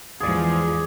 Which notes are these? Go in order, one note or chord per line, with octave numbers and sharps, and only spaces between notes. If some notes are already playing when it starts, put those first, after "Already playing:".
E2 G#2 F3 G#4 D5